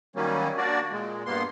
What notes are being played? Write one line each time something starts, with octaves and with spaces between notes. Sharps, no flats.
D#3 F#3 G3 A#3 C#4
A#3 D4 F#4 D5
A#2 G#3
G2 A#3 B3 C6